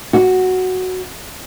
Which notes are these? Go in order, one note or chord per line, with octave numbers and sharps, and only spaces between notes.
F#4